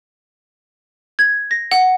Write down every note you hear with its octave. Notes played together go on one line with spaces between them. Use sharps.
G#6
A#6
F#5